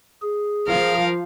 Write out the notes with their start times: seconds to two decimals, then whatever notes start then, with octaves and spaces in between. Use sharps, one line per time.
0.22 G#4
0.67 F3 A#4 F5